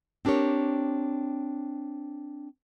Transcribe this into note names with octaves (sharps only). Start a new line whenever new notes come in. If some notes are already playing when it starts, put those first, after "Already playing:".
C4 D4 G4 A#4 C#5